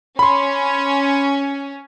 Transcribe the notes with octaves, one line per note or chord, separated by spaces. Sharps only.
C#4 B5 C6